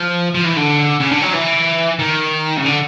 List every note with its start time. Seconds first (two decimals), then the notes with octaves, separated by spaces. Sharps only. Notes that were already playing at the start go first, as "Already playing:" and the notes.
Already playing: F3
0.35 F3
0.45 E3
0.57 D3
1.00 C#3
1.12 D3
1.22 F#3
1.33 E3
1.99 D#3
2.57 C#3
2.65 D3